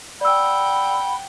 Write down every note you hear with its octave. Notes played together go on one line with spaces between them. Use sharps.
D5 F#5 G5 B5 E6